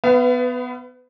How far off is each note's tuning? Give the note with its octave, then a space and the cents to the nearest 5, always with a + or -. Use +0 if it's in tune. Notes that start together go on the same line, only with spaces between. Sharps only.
B3 +10 B4 +30 F5 -45